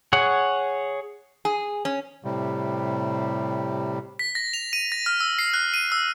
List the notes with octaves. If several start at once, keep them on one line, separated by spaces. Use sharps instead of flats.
G#4 C#5 F#5
G#4
C#4
A2 C3 G3
B6
A#6
F7
D#7
A#6
F6
E6
C7
F#6
D#7
E6